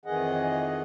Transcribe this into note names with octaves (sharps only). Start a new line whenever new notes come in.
F2 D#3 E3 G#4 D#5 F#5